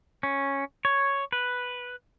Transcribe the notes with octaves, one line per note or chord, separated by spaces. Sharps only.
C#4
C#5
B4